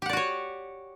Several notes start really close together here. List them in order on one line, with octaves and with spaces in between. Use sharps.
G4 F#5 D5 F#4 C#5